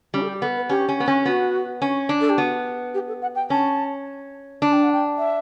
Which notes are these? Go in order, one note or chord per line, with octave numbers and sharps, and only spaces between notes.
G3 C#4
A4
G4
B3 A4
B4
C#4 G4
C#4
B3
C#4
B3 F#4
C#4
D4
A4
G4
B3 F#4
G4
A4
F#5
G5
C#4 A5
D4 A5
G5
F#5
G5
E5